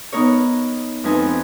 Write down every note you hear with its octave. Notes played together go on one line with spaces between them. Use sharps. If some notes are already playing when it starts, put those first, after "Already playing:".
B3 D#4 A#4 C#5
F2 F3 D#4 B4 G#5